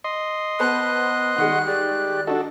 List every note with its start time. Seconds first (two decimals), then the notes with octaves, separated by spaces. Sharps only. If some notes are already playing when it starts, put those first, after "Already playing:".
0.04 D#5 C6
0.60 B3 B4 C5 A5 F#6
1.38 D#3 G3 G#3 F#5
1.67 G4 D5
2.27 D4 D#4 F#4 A4